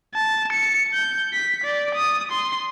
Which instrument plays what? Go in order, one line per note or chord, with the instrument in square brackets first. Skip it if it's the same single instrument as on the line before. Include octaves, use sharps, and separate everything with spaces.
[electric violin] A5
C#7
G6
B6
D5
D#6
C6